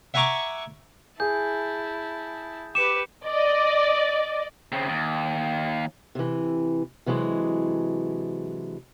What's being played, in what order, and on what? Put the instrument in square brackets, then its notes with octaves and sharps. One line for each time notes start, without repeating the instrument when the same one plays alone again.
[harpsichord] E5 F#5 G#5 A#5 C#6 D6
[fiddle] E4 A5 [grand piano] G#4 [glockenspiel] G6
[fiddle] G4 B4 [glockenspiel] D6 C#7 [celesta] E7
[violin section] D5 D#5
[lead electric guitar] C#3 C4
D#2
[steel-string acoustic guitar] C3 E3
C3 E3 F#3 G#3 D4